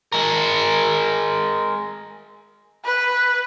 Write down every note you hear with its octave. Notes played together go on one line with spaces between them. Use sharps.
G#3 A#4
B4